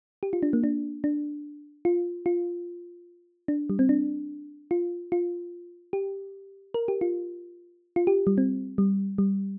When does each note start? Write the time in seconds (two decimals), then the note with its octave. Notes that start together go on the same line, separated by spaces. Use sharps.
0.23 G4
0.33 F4
0.43 D4
0.53 A#3
0.64 D4
1.04 D4
1.85 F4
2.26 F4
3.48 D4
3.70 G3
3.79 C4
3.89 D4
4.71 F4
5.12 F4
5.93 G4
6.74 A#4
6.88 G4
7.01 F4
7.96 F4
8.07 G4
8.27 G3
8.38 C4
8.78 G3
9.18 G3